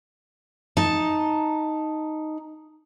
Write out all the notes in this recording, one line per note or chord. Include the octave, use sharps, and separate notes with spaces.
D#4 A5